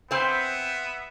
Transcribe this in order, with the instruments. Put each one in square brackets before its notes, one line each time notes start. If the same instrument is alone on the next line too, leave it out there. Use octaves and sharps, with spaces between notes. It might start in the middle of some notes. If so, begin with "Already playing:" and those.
[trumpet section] B3 E5 [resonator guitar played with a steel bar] C4 C5